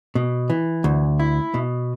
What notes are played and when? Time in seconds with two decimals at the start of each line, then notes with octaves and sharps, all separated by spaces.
0.15 B2
0.50 E3
0.84 D2
1.19 E4
1.54 B2